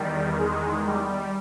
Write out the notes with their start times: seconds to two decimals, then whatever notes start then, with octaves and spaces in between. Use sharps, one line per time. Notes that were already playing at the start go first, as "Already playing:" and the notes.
Already playing: E2 D#3 G3
0.39 G#3
0.86 G3